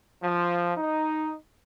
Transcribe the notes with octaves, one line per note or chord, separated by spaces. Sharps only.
F3
D#4